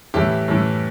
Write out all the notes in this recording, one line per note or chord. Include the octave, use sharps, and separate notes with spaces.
A2 E3 E4 G4
A2 E3